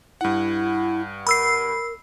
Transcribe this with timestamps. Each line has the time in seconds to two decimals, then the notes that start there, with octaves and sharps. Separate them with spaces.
0.21 G2 E4 F#5
1.27 A#4 B5 E6 C7